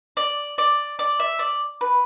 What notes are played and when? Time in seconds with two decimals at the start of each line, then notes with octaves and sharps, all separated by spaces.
0.17 D5
0.58 D5
0.99 D5
1.20 E5
1.39 D5
1.81 B4